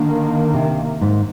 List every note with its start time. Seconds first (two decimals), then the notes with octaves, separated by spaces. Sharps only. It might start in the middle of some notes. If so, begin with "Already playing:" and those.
Already playing: D3 D#3 A#3
0.54 C3
1.01 G#2